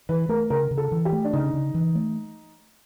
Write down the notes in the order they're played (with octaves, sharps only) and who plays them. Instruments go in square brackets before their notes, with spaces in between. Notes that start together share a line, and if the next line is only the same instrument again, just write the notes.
[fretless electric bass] E3 [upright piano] B4
[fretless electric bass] A3 [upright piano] A#4
[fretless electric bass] C#3 [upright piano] A#4
[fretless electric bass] C#3
[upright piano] A4
[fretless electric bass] E3
[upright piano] G4
[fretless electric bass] A3
[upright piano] D4
[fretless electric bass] C#3 [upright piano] D#4
[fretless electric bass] C#3
E3
A3